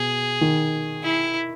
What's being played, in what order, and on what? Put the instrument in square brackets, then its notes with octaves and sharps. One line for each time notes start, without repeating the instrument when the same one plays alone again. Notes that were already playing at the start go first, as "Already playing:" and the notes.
Already playing: [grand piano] B2 [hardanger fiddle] G#4
[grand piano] D#3
[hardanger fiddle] E4